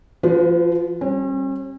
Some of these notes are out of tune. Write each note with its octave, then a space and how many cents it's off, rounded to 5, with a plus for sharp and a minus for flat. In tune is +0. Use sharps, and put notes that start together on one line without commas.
F3 -20 F4 +40 B4 +35
G3 +0 C#4 -45